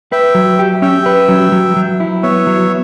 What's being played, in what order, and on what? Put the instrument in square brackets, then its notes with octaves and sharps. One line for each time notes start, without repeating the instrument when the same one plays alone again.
[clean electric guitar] B4 [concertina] E5 G5
[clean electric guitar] F#3
G4
[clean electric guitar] C#4 [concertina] E5 G5
[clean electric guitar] B4
F#3
F#3
F#3
E4
[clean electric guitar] B3 [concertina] C#5 E5
[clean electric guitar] F#3